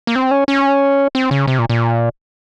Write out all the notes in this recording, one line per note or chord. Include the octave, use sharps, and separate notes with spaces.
A#3
C4
C#4
C#4
C4
C#3
C3
A#2
A#2